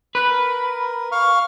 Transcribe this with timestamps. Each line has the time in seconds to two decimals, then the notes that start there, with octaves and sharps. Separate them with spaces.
0.15 B4 F#6
0.29 A#4
1.12 F5 C#6 F6